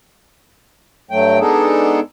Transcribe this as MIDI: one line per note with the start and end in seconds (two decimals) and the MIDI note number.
1.11 1.39 43
1.11 1.39 54
1.11 1.39 57
1.11 1.39 79
1.39 2.00 56
1.39 2.00 59
1.39 2.00 62
1.39 2.00 63
1.39 2.00 68
1.39 2.00 69